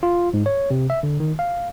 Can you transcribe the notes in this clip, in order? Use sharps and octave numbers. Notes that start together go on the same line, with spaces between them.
F4
G#2
C#5
C3
E5
D3
D#3
F5